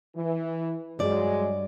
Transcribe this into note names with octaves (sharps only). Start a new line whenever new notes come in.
E3
G2 F#3 G#3 D5